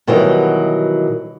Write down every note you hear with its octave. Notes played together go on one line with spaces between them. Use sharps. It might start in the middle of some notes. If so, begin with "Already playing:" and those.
B2 D#3 E3 F#3 G3